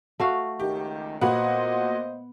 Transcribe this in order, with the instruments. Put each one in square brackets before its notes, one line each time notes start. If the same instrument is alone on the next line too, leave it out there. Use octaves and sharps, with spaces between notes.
[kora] A3 F#4 F5
[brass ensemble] C#2 D#3 [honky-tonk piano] G4
[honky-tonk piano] A#2 F#4 F#5 [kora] B3 [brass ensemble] C5 D#5